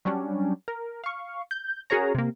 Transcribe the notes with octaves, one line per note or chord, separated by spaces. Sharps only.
F#3 G3 C#4 D4
A#4
F5 C#6
G6
C#4 F#4 G#4 A#4 C#5 A#5
C3 A#3